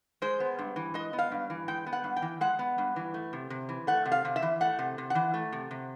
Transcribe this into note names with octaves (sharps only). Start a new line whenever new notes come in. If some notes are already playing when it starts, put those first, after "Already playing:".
G#3 C5
B3
G2
E3
G#3 D#5
B3
F5
G2
E3
G#3 G5
B3
F#5
G2
G5
E3
G#3 F#5
B3
G2
E3
A3
C3
C3
E3
A3 F#5
C3
F5
C3
E5
E3
A3 F#5
C3
C3
E3 F#5
A3
C3
C3